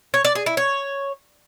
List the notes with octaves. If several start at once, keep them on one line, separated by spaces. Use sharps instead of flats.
C#5
D5
G#4
E4
C#5